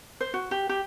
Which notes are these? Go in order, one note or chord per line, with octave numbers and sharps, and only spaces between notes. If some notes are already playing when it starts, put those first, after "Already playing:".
C5
F#4
G4
G4